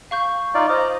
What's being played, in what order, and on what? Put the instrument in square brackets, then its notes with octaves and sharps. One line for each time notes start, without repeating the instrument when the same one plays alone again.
[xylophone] F5 C#6 G6
[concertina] D#4 F4 D5
[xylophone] C5 [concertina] D#5 A#5